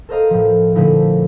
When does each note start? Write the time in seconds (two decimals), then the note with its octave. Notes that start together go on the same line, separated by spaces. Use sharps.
0.09 A4 A#4 C5 D#5 F5 A#5
0.30 A2 F3
0.75 A#2 D3 F3 A3 D#4 E4